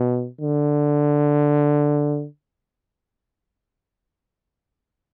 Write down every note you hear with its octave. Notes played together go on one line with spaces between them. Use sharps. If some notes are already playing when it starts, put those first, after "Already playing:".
Already playing: B2
D3